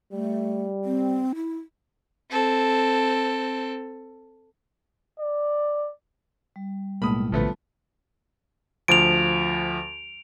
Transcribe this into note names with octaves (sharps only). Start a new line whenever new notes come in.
G3 A3
C4
E4
C4 A4
D5
G3
B1 A2 G#3 A#3 B5 D#6
A#1 A#2 D3 F3 A3 B3
D2 F3 D7 F7